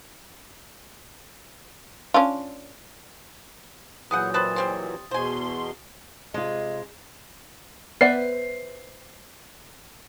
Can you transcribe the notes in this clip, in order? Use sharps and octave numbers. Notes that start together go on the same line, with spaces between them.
C#4 D4 F4
A#2 E3 F#3 B3 G#4 F#5 D#6 G6
C4 A4 B4 D#6 A6 E7
G3 C4 C6
E2 B2 C5 G#5 C6
C3 G#3 F4 D#5
B3 B4 C5 D5 E5 F#5 C7